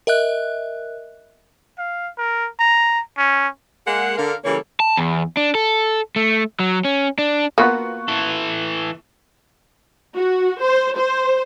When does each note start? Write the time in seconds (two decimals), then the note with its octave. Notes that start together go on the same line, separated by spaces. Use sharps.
0.07 A#4 D#5 E5 F#6
1.78 F5
2.18 A#4
2.59 A#5
3.18 C#4
3.87 G#3 A#3 F#5
4.18 D3 A#4 F5
4.44 C#3 E3 G3 A#3 A4 C#5
4.80 A5
4.97 E2
5.37 D4
5.55 A4
6.16 A3
6.60 F#3
6.85 C#4
7.18 D4
7.58 A#3 B3 F4 F#4 C#6 F#6
8.08 E3 A4
10.16 F#4
10.61 C5
10.97 C5